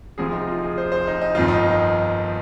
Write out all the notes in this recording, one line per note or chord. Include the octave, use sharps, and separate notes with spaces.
D2 C3 F3 G#4
D#4
F4
G#4
C5
C5
D#4
D#4
G1 F2 D#3 F4
D#4